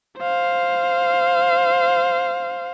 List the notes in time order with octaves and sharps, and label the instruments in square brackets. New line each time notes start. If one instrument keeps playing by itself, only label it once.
[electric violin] C5 F5